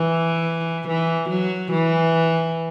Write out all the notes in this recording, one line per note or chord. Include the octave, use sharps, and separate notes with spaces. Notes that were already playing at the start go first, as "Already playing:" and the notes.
Already playing: E3
E3
F#3
E3